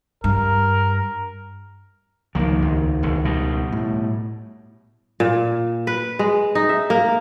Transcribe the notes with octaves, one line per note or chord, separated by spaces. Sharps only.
G2 A#4
C#2 D#3 F3 A#3
D#2
E1 D#2
B2 G3
A2
A#2
B4
G#3
D#4
E5
A#3